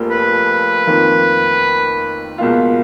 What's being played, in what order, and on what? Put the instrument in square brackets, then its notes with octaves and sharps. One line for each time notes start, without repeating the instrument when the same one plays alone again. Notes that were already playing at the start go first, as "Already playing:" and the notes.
Already playing: [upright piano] F1 F2 F3 A#3 F4
[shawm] B4
[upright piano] F2 D#3 A#3 F4
C#2 B2 A#3 F4